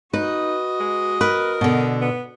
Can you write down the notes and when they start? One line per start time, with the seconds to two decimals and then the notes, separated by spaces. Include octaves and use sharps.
0.13 D#4 F#4 B4 D#5
0.80 G#3
1.21 A#4 B4
1.61 B2 D3
2.02 B3